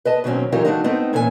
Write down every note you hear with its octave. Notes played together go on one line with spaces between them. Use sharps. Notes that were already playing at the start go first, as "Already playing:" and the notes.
B4 D#5 A5
B2 D#3 F#3 C4 C#4
E3 F#3 D#4 F4 G4 A#4
E3 A3 D4 D#4 F#4 D#5
A3 B3 C4 D#4
A#2 E3 C#4 E4 A#4 G#5